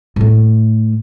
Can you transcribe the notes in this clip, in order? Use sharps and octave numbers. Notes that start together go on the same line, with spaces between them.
A2 A3